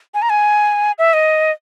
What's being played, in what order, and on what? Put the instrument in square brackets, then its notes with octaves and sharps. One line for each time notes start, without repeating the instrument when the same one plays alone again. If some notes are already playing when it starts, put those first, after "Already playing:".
[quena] G#5
A#5
G#5
E5
D#5